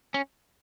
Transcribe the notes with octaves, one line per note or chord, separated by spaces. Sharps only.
C#4